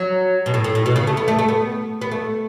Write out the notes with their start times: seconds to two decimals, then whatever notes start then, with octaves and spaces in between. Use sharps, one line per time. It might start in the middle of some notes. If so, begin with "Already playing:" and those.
Already playing: F#3
0.46 B2
0.54 A2
0.64 A2
0.75 A2
0.86 B2
0.96 C#3
1.07 A3
1.17 B3
1.28 A3
1.39 A3
1.49 B3
2.01 B3
2.11 A3